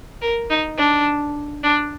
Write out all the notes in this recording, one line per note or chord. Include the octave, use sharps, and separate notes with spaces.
A#4
D#4
D4
D4